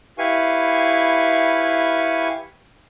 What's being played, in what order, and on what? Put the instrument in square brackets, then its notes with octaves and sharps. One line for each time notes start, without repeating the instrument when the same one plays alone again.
[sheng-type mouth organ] E4 G4 B4 F5 G#5 C#6